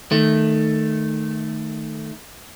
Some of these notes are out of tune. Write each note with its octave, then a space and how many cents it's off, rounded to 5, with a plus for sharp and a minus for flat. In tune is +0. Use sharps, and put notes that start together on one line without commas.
D#3 -10 A3 +0